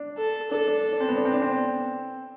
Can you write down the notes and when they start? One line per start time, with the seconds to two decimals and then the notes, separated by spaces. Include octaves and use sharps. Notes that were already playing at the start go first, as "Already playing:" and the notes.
Already playing: D4
0.18 A4
0.51 D4 A4
0.68 D4
0.93 D4
1.00 C4
1.09 B3
1.17 D4
1.25 C4
1.34 D4
1.42 C4